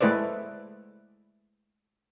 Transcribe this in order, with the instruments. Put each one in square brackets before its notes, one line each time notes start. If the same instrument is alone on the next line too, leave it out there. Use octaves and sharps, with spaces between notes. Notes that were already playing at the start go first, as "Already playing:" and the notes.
[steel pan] G#3 A3 E4 B4 C5 D5